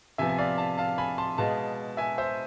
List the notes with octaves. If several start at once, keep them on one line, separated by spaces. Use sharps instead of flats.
C3 F3 B3 E5 G#5
G#5
D5 F5
F5 A5
F5 A5
G#5 B5
A5 C6
B2 G#3 B3 F5 A5
E5 G#5
C5 E5